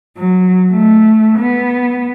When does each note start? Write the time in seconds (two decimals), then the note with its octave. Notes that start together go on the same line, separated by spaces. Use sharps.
0.18 F#3
0.73 A3
1.39 B3